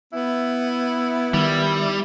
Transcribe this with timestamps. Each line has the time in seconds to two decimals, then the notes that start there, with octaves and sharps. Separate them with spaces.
0.13 B3 E4
1.34 D#3 G3